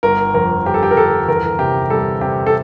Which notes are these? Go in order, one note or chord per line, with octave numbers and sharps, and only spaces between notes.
G1 A#4
F2 A#4
G1 G4
A4
G4
A#4
G1 A4
E2 A#4
C3 G4
G3 A4
C3 G4
A4